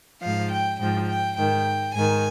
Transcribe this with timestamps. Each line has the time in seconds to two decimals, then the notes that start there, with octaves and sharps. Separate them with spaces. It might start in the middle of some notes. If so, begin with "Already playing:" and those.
0.22 G#2 F3 F5
0.51 G5
0.79 G#2 F3 G5
1.08 G5
1.38 G#2 D#3 G5
1.95 G#2 D#3 G#5